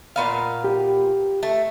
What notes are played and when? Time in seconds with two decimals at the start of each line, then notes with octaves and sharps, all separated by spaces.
0.16 A#2 B3 F5
0.64 G4
1.43 A3